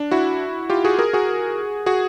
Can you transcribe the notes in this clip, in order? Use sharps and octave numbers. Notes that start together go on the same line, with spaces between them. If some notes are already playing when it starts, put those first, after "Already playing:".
Already playing: D4
E4 F#4
F4 G4
F#4 G#4
G#4 A#4
F#4 G#4
F#4 G#4